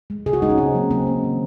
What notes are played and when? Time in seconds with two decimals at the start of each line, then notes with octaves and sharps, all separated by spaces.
0.10 G#3
0.26 C#3 G#4
0.33 F#4
0.42 G#3 D#4
0.49 C#4
0.58 C#3 C4
0.74 F#3 A#3
0.90 C#3 C4
1.07 F#3 A#3
1.24 D#3